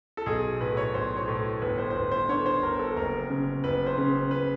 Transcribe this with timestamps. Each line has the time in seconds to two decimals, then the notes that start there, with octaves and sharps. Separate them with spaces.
0.17 A4
0.26 B1 G#4
0.61 A2 B4
0.77 C#5
0.94 B1 C5
1.17 C#5
1.28 A2
1.62 G1 B4
1.78 C5
1.90 C5
1.95 G1 B4
2.12 C5
2.29 D3 C#5
2.46 C5
2.62 G1 A#4
2.79 A4
2.96 F#1 A#4
3.30 C#3
3.64 F#1 B4
3.86 C5
3.98 C#3
4.31 B4